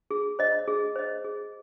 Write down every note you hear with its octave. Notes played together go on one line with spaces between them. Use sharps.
G#4
C5 D#5
G#4
C5 D#5
G#4